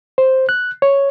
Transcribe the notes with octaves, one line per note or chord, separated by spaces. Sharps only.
C5
F#6
C#5